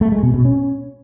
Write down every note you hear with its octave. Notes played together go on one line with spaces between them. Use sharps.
A3
G#3
B2
B2
C#4